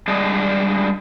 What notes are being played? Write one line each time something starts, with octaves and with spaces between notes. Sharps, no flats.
G3 G#3 D4 D#5